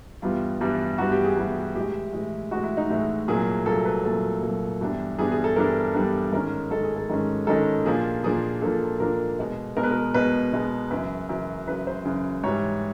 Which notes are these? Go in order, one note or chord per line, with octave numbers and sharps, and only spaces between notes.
G2 E3 G3 B3 F4
G2 E3 G3 B3
G2 E3 G3 B3 F#4
G4
G#4
G2 E3 G3 B3
A2 E3 G#3 G4
A2 E3 G#3
A2 E3 G#3 F#4
E4
D#4
A2 E3 G#3
C2 A#2 F#3 A#3 G#4
C2 A#2 F#3 A#3 A4
B4
C2 A#2 F#3 A#3 A4
C2 A#2 F#3 A#3
G2 E3 G3 B3 D4
G2 E3 G3 B3 D4 G#4
G#4
A4
G2 E3 G3 B3 D4 A#4
G2 E3 G3 B3 D4
G#2 D#3 G#3 C#4 A#4
G#2 D#3 G#3 C#4 A4
G#4
A4
G#2 D#3 G#3 C#4
G#2 D#3 G#3 C#4 A4
A#2 F3 A#3 D4 G#4
A#2 F3 A#3 D4 G#4
A#2 F3 A#3 D4 A4
A#2 F3 A#3 D4 A#4
B2 G#3 B3
B2 G#3 B3 A#4
B4
A#4
B2 G#3 B3 B4
B2 G#3 B3
F#2 C#3 E3 B4
F#2 C#3 E3
F#2 C#3 E3 B4
C5
F#2 C#3 E3
G#2 E3 G3 C#5